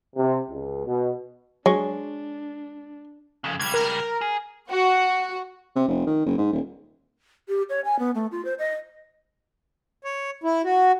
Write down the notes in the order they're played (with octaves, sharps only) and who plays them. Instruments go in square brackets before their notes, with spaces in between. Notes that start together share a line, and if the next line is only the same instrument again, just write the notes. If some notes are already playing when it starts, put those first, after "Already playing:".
[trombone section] C3
C#2
B2
[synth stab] F#3 [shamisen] G#3 [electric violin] D4 [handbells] C#5 C#6
[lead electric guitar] F2 C#3
[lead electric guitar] C#2 G3 [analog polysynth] G#6
[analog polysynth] A#4
[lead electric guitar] G#4
[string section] F#4
[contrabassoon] C3
F1
D#3
F#1
G#2
D#1
[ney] G4
C#5
G#5
B3
A3
F4
C5
D#5
[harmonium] C#5
E4
F#4